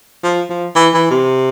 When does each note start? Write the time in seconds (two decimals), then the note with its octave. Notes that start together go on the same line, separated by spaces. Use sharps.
0.23 F3
0.50 F3
0.76 E3
0.94 E3
1.11 C3